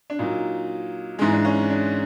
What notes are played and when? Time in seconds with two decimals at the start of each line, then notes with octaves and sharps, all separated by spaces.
0.10 D4
0.19 A#2 F#3 D#4
1.19 G#2 E3 G#3 D#4
1.33 D4
1.45 C#4
1.70 D4